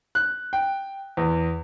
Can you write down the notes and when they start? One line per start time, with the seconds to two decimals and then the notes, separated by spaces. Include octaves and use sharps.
0.15 F#6
0.53 G5
1.17 E2